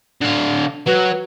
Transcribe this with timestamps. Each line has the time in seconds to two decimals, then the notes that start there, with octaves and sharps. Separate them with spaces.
0.21 D3 F5
0.86 F#3 B4